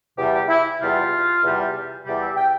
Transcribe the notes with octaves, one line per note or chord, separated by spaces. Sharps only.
E2 C3 G3 G4
G4
E4
E2 C3 G3 F4
E2 C3 G3
E2 C3 G3 D5
E5
G5